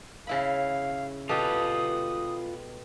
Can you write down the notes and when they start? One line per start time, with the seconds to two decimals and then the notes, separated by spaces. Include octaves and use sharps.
0.27 C#3 E4 F5 B5
1.29 B2 F4 G4 A4 B4 D#6